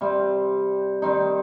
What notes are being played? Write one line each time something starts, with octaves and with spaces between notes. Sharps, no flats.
C3 G3 C4
D#3 G3 C4 D#4